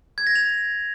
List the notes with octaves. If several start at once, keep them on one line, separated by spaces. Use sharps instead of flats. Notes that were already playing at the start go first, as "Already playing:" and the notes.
G#6
A#6
F7